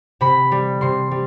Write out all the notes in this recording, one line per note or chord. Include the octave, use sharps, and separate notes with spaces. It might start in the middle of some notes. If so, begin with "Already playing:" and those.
C3 B5
G3
C3 C6
G3